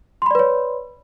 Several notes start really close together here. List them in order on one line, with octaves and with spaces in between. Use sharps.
C6 B5 D5 B4 C#5